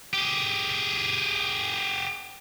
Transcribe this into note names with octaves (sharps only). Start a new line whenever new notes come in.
G4 G#4